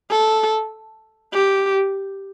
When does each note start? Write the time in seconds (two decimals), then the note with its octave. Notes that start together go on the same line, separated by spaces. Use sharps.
0.11 A4
1.33 G4